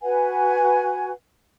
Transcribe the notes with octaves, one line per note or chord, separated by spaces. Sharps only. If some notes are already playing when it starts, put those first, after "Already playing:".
F#4 B4 F#5 G#5